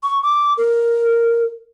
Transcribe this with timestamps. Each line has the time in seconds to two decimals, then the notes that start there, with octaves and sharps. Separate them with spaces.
0.03 C#6
0.23 D6
0.57 A#4